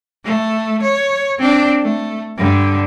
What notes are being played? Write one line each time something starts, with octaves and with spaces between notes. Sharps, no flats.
A3
C#5
C4 D4
A3
G2 D3